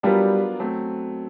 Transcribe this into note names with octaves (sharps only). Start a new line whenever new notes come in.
F#3 G3 B3 D4 F4 G4 A#4
F#3 A3 C4